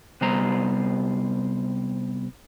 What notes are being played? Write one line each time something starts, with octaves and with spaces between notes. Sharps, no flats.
C3 G3 B3 C5 A#5